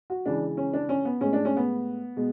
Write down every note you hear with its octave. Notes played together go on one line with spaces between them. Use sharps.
F#4
C#3 E3 G#3 D4
C#4
D4
C#4
B3
A2 G#3 C#4
D4
C#4
B3
B2 G#3